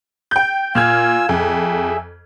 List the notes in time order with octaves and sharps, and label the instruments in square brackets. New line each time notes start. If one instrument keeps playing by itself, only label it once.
[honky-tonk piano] G5 G6
[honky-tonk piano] A#2 F6 G#6 [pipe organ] F4 G#5 E6
[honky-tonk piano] F2 [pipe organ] G#4 E5